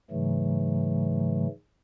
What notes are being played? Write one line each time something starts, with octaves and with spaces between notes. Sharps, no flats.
G#2 C#3 E3 F#3 A3